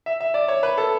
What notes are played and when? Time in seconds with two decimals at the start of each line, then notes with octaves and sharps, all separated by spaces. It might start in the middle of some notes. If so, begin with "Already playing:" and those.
0.06 E5
0.20 E5
0.34 D5
0.48 C#5
0.63 B4
0.78 A4